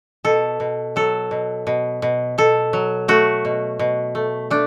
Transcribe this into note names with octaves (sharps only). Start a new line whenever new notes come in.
B2 A4
B2
F#3 A4
B2
B2
B2
B2 A4
F#3
A3 F#4
B2
B2
A3
A3 D4